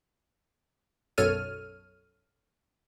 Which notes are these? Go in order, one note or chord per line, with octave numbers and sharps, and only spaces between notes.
B1 F#2 A4 C#5 F6 D#7